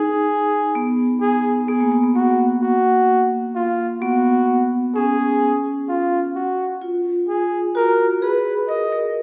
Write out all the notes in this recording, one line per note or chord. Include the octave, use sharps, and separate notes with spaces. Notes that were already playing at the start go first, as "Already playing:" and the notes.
Already playing: D#4 G#4
B3
G#4
B3 G#4
A#3
B3
B3
A#3 F#4
F#4
F4
B3 F#4
C#4 G#4
F4
F#4
F4
G#4
F#4 A#4
G#4 B4
A#4 D#5
A#4